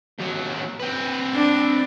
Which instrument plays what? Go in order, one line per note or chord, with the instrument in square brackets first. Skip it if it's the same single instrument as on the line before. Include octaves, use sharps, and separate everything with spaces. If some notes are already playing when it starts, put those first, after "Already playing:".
[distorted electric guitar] D#2 F#3
C4 B4
[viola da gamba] D4